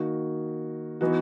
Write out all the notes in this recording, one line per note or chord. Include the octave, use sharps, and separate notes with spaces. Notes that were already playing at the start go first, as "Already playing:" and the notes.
Already playing: D#3 A#3 D#4 F#4
E3 B3 D#4 F#4